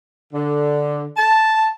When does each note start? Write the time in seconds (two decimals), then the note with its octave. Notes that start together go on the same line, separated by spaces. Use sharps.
0.33 D3
1.16 A5